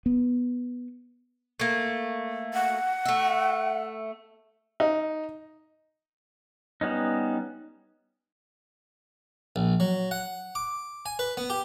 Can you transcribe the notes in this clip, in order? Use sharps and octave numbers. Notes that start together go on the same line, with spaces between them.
B3
A3 A#3
F#5
A3 E5
D#4
G3 B3 C#4 D#4
A#1
F#3
F#5
D6
G#5
B4
B3
G4